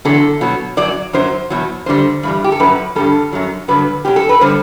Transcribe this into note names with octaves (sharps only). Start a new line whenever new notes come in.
E2 D3 F#3 A4
B2 F#3
F#2 F#3 D5
F#2 F#3 C5
E2 B2 F#3
F#2 D3 G3 C5
G2 E3 G3
G4
A4
F#2 F#3 B4
G2 D3 G3 A4
F#2 F#3
G2 D3 F#3 B4
B2 F#3 G4
A4
B4
D3 G3 C5